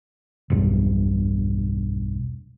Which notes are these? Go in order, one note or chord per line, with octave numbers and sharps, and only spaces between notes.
E1 B1 G2